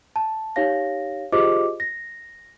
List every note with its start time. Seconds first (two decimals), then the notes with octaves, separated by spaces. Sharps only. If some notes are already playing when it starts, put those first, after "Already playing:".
0.16 A5
0.56 D#4 G4 C#5 F5 A#6
1.32 F4 G4 G#4 C5 D#5 D6
1.80 A#6